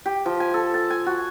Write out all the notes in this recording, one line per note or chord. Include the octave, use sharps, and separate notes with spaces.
G4
F3
G#5
A4
A5
G#5
F#4